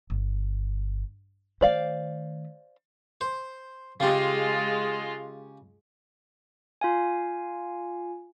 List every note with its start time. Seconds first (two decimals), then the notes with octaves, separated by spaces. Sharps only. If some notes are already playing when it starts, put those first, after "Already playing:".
0.10 G1
1.61 D#3 A3 C5 D5 F5
3.21 C5
4.00 C#3 G#3 F4 G4
6.81 F4 F5 G#5